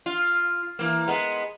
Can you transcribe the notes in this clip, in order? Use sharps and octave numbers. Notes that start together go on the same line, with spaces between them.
F4
E3 A#3
G#3 B3